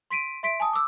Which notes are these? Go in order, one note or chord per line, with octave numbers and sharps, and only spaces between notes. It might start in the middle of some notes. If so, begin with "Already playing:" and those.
C6 B6 D7 D#7
E5 C6 B6 D7
G#5 A5 D#6
D6 E6